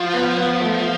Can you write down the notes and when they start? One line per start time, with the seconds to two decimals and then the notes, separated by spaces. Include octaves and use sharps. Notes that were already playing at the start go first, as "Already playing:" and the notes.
Already playing: F3 F4
0.14 B3
0.37 B3
0.61 A3